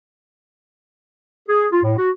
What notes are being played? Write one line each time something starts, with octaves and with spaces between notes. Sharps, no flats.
G#4
F4
A2
F#4